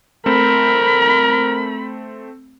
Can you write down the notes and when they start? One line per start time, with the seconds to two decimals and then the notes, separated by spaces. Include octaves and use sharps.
0.26 A3 C4 A#4 B5